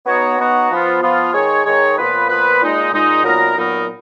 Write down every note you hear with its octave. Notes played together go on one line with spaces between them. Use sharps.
B3 D#4 F#4 C#5
B3 D#4 F#4 C#5
F3 B3 F4
F3 B3 F4
D#3 G#3 D#4 G#4 C#5
D#3 G#3 D#4 G#4 C#5
A#2 F3 B3 F4 B4
A#2 F3 B3 F4 B4
A#2 G#3 D#4
A#2 G#3 D#4
A#2 F#3 B3 D#4 A#4
A#2 F#3 B3 D#4 A#4